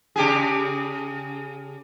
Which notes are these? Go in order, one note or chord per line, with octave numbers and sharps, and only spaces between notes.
C#3 G4 G#4